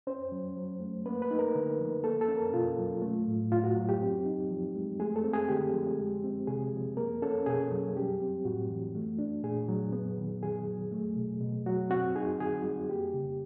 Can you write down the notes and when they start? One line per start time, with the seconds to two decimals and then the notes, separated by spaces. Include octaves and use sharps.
0.07 C#4 C5
0.32 F#3
0.57 F#3
0.80 A3
1.06 A#3 B4
1.22 B4
1.31 D#4
1.39 A#4
1.55 D3
1.79 F3
2.04 A#3 A4
2.21 A4
2.28 C#4
2.36 A#4
2.53 B2 F4
2.79 F#3
3.02 A3
3.27 A2
3.51 A2 F4
3.64 F#4
3.77 F#3
3.89 G4
4.02 C4
4.25 D#4
4.51 F3
4.75 G#3
5.00 A3 G#4
5.16 A4
5.24 C4
5.33 G#4
5.49 D3 G4
5.73 F3
5.99 G#3
6.24 C4
6.47 C3 G#4
6.73 F3
6.97 A#3 A#4
7.22 C#4 A4
7.46 B2 G#4
7.72 F#3
7.96 G3 G4
8.21 C4
8.45 A2 F#4
8.69 E3
8.95 A3
9.19 D4
9.43 A#2 G#4
9.69 F#3
9.93 B3
10.18 D#3
10.42 D#3 G#4
10.67 F#3
10.92 A3
11.16 B2
11.41 B2
11.66 F#3 F#4
11.90 C4 F#4
12.15 D#4 G#4
12.40 D3 G#4
12.64 G3
12.89 A#3 G4
13.14 C#3